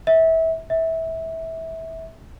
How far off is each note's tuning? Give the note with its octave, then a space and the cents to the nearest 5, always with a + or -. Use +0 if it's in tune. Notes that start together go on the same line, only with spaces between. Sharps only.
E5 -25
E5 -20